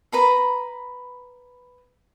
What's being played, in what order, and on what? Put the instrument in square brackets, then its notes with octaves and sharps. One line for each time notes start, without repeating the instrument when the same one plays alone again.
[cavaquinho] B4 A#5 B5